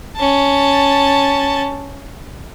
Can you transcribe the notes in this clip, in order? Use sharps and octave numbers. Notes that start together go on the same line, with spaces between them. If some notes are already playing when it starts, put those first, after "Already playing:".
C#4 A5